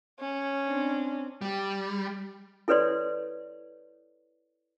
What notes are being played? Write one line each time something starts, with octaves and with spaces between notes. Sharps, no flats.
C#4
C4 D4
G3
E4 A4 B4 C#5 D5 C6